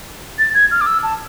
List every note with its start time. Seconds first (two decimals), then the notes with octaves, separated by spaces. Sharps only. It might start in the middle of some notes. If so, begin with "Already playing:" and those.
0.39 A6
0.54 G#6
0.71 F6
0.81 D6
0.86 E6
1.03 A5